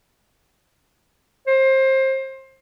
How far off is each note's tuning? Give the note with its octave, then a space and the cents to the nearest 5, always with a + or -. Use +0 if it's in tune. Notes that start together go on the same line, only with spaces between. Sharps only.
C5 +25